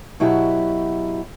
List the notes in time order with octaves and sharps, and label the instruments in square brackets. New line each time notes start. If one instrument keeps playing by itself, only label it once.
[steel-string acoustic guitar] B2 F#3 E4 F#4 G4